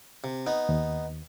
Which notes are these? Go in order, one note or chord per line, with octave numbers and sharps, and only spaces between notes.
C3
B3 D#4
D#2